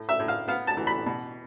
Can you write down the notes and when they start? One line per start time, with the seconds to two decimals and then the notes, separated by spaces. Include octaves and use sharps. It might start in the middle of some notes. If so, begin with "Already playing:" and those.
Already playing: A2
0.09 E5
0.19 A2
0.28 F5
0.48 B3 F5
0.67 A5
0.77 E3
0.87 B5
1.06 B2